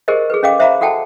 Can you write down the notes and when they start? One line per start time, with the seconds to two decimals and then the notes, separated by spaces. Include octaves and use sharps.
0.08 G4 G#4 A#4 C5 D#5
0.30 G#4 A4 B4
0.43 C#4 G#4 D#5 F5 G5 D6
0.59 C5 E5 F5 A#5 B5 D6
0.81 F#4 A4 F#5 G5 A5